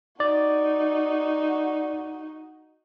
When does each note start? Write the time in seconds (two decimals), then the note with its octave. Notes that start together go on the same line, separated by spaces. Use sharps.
0.20 D#4 F#4 D5